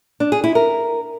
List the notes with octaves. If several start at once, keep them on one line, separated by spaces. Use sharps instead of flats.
D4
G#4
E4
A#4